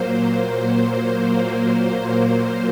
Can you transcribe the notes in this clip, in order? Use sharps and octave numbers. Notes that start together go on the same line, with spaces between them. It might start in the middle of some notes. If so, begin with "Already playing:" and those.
Already playing: A#2 F#3 A#3 C5